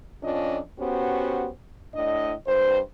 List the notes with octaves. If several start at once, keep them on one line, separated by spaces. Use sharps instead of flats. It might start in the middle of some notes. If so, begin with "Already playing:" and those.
F2 C#4 D4 F4 D#5
B3 C#4 F#4 G4 C5
A2 D4 D#5
G2 C5